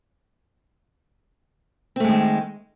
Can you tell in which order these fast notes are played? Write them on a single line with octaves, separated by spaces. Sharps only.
C4 A3 G#3 D#3